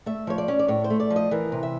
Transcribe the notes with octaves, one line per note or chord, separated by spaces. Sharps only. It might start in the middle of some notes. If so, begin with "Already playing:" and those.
A3 E5
F3 C#5
D5
C#4
D5
A2 C#5
C5
A3
D5
F3
D#5
E3 A#4
C3
E5